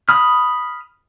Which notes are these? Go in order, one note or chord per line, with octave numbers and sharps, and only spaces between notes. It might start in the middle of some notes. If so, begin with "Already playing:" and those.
B5 D#6 F6